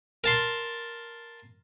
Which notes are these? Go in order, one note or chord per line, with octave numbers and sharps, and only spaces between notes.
A#4 A5 C6